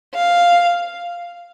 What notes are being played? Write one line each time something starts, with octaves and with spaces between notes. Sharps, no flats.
F5